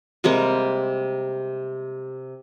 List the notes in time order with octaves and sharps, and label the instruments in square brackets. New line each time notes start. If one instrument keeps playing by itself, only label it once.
[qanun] C3 G3 G#3 A#3